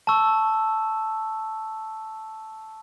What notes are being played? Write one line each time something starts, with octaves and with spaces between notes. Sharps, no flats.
A5 C#6 E6